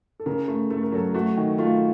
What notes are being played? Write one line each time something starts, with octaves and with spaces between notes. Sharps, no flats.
A4
C#3 A#4
A3
A3 A4
A#4
F#3 A4
A3 F#4
D#3
A3 F4